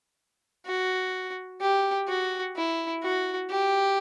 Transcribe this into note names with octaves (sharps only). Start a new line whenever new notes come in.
F#4
G4
F#4
E4
F#4
G4